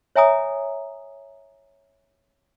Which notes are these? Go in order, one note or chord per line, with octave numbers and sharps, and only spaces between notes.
C#5 E5 G#5 A#5 D#6